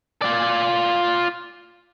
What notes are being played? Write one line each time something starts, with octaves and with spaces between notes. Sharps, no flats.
F4 D5